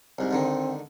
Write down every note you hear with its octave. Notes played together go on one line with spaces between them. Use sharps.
C2 G#2
G#2 D3 D#3 C4